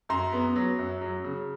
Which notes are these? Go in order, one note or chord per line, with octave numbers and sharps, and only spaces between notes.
F#2 A#5 C6
B3
F#3
F#2
F#3
C#3